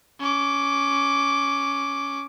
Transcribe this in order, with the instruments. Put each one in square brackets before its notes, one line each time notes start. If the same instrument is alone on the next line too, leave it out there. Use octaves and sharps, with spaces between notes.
[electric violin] C#4 D6